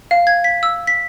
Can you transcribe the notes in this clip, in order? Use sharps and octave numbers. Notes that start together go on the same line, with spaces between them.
F5
G#6
B6
E6
B6